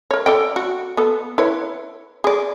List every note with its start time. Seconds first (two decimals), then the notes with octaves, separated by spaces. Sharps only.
0.11 A#4 C#5
0.26 A4 D5 G5
0.56 F#4
0.97 B3 A4
1.38 E4 B4 C#5
2.24 G#4 D5